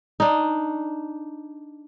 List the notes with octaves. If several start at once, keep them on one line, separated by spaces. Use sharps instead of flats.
D4 D#4